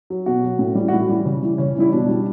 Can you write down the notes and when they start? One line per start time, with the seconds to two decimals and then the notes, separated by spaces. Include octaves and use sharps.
0.10 F#3
0.26 B2 F#4
0.43 F#3
0.59 A2
0.75 E3 G3
0.88 F#4
0.93 A2 E4
1.09 E3 G3
1.25 C#3
1.42 E3 G3
1.58 C#3 C#4
1.76 E3 G3 E4
1.92 B2 D4
2.08 G3